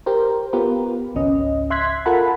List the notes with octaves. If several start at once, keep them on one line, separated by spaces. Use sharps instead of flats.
G4 A#4 C5
B3 F4 G4 A#4 B4
G#1 C#2 C#4 D#5
E5 C6 F#6 G#6 B6
F4 A4 A#4 F#5 A5 B5